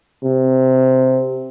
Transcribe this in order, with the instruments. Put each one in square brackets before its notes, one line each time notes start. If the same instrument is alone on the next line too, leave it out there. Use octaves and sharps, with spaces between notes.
[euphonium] C3